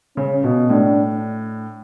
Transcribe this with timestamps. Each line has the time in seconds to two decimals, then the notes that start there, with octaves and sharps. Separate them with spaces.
0.17 C#3 C#4
0.44 B2
0.70 A2 D4